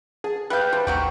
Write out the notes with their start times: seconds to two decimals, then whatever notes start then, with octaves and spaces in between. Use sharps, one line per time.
0.24 G#4 A5
0.50 G3 B4 F5 G5 F#6 G6
0.73 G3 C5 A5
0.87 A1 D#2 F#3 F#4 G4 F#5